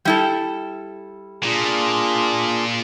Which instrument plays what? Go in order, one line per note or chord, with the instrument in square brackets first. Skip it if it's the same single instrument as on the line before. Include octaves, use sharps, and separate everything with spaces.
[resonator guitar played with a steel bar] G3 E4 A4
[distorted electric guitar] A#2 [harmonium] D4 F4 G#4